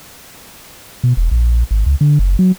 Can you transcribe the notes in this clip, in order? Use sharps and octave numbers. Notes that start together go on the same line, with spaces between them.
B2
E1
A#1
G#1
C#2
D3
F#1
F#3